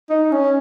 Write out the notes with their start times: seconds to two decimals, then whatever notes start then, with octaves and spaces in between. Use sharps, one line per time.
0.10 D#4
0.32 C#4